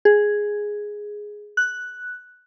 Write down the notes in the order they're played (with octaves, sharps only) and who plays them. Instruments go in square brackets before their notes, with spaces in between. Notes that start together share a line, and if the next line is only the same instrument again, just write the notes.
[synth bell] G#4
F#6